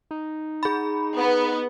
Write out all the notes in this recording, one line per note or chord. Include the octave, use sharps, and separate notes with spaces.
D#4
G#4 B5
B3